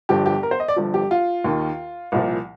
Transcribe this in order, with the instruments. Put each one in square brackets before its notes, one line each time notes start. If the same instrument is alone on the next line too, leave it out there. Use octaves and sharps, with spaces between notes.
[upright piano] G1 G2 F3 G4
G4
A#4
C5
D#5
D5
G1 G2 F3
G4
F4
D#2 D#3
C2 A#2 F3